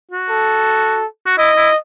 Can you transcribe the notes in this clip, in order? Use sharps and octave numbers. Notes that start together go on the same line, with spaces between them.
F#4
A4
F#4
E4 D#5
E4